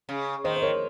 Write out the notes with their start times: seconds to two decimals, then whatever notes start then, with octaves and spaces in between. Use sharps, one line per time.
0.09 C#3
0.44 D#3 C5 D#5
0.56 C5
0.62 A#4 C#5